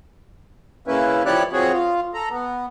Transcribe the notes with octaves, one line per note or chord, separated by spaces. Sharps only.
C#3 A#3 C#4 E4 B4
F3 E4 G4 C#5 D5 F#6
F3 C4 F#4 G#4 C#5
F4
A4 A#5
B3